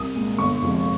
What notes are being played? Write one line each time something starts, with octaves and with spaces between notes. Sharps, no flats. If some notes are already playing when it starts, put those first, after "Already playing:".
Already playing: C2 D#6
A#2 G#3
G1 C#6
F2 C3 F3 G#3